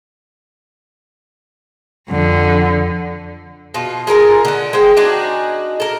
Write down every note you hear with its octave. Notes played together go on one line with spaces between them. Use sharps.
F2 D3
B2 F4
G#3 F4 A#4 G#5
D3 F#5
G#3 C5 G5
D4 D#4 F#4 G#5
A4 A#4